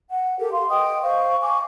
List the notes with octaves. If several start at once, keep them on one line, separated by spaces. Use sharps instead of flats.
F#5
G4 A4 A#4
F5 C6
B4 D#5 G5 D#6
C5 F5 C#6
F5 G#5 C#6 D6